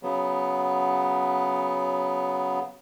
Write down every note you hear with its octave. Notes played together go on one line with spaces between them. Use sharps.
C#3 F#3 B3